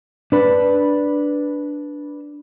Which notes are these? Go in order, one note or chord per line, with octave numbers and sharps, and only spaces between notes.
D4 B4